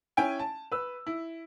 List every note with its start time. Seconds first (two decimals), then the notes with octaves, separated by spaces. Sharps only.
0.17 C#4 E4 G5 G#5
0.39 A5
0.72 B4 E6
1.07 E4